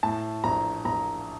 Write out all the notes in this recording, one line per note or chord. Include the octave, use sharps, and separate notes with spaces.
A2 A5
A#1 A#5
A#1 A#5